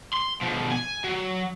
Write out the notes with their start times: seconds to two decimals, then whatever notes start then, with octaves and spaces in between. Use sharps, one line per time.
0.13 C6
0.41 B2 F3
0.71 G#5
1.04 F#3